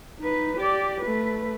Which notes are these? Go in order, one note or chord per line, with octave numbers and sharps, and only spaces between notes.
D#4 B4
G4 D5
A3 B4